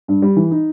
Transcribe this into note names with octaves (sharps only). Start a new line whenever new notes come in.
G2
G3
E3
D#4